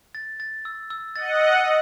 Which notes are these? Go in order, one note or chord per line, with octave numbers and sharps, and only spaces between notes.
A6
A6
E6
E6
D#5 F#5 A6
E6
E6